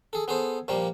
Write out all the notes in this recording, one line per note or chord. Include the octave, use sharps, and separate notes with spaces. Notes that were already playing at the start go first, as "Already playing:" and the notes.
G#4 A4
B3 G#4 A4 C5
A#2 F3 G3 A#3